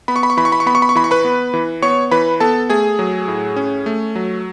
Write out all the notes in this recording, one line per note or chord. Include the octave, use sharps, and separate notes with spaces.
B3 B5
C#6
B5
C#6
E3 B5
C#6
B5
C#6
B3 B5
C#6
B5
C#6
E3 B5
C#6
B4 B5
B3
E3
B3 C#5 C#6
E3 B4 B5
B3 A4 A5
A3 G#4 G#5
F#3
A2
C#4
A3
F#3